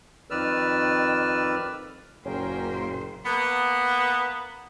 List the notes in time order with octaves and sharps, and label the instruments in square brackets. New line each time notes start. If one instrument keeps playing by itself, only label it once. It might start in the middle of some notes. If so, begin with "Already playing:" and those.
[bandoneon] F2 D#3 B4 D5 E6 F6
[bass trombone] F#1 [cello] A#2 C5 [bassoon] C#4 [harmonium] G#4 A#4 G5
[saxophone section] A#3 B3